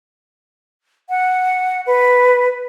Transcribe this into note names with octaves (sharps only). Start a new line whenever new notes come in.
F#5
B4